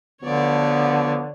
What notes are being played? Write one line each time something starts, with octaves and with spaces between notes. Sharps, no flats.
D2 D3 F3 B3 C#5 D5